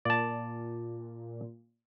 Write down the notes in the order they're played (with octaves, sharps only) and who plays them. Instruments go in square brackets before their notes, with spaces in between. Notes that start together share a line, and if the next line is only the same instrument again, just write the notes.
[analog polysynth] A#2 [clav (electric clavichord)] D5 A5